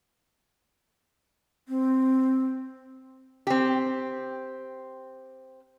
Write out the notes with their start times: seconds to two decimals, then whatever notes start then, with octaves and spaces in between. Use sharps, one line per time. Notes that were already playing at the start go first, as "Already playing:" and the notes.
1.68 C4
3.47 C4 G4